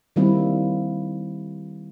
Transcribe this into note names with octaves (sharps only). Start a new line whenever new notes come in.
D#3 G3 A#3 C4 E4